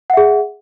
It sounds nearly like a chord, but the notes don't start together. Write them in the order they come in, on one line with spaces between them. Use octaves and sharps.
F#5 E5 G#4